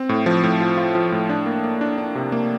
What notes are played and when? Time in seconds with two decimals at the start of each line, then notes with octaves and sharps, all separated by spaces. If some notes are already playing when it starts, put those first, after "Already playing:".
Already playing: C4
0.09 A2
0.26 F3
0.43 A2
0.60 F4
0.77 F4
0.95 F3
1.12 A2
1.29 D4
1.46 A#3
1.64 A#3
1.81 D4
1.98 D4
2.15 C3
2.32 A#3